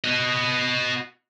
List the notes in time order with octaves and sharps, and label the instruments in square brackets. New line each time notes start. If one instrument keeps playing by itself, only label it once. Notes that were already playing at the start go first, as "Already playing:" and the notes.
[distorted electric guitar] F#4 D#5